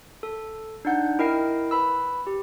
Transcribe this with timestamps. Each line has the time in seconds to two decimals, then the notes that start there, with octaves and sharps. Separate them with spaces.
0.23 A4
0.85 D4 D#4 F#5 G6
1.19 E4 A#4 D#5 G5 C7
1.71 B4 B5 E6
2.27 G4